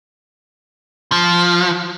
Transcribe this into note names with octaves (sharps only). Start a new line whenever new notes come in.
F3